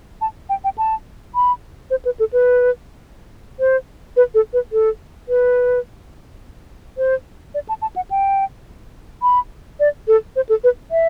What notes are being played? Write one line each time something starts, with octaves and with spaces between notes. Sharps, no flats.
A5
G5
G5
A5
B5
C5
B4
A4
B4
C5
B4
A4
B4
A4
B4
C5
D5
A5
A5
F#5
G5
B5
D5
A4
C5
A4
B4
E5